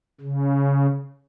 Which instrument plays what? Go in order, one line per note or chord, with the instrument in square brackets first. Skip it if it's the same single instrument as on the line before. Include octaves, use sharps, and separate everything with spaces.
[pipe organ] C#3